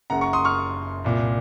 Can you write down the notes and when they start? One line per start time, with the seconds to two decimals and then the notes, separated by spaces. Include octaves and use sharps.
0.10 F#1 F#2 C#3 F#5 A#5
0.21 A#5 C#6
0.33 C6 D#6
0.45 C#6 F6
1.04 C2 A#2